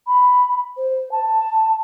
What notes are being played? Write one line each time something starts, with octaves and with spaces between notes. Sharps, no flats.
B5
C5
A5